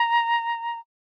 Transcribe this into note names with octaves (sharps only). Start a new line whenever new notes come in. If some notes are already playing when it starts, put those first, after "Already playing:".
Already playing: A#5